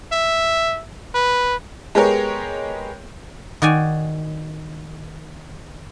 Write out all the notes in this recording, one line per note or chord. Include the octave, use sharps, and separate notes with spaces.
E5
B4
G#3 B3 G4 G#4 A#4 C#5
D#3 F#4 D5 G#5